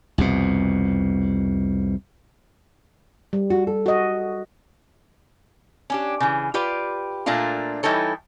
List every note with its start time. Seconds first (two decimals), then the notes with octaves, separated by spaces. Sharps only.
0.18 C2 F2 B2
3.33 G3
3.50 F#4
3.67 A4
3.86 F#4 D#5
5.90 C#4 D4 G4
6.20 C#3 E3
6.54 F4 G4 B4 D5
7.26 A#2 A3 A#3 D4 F4
7.83 E3 G3 D#4 E4 A4 C#5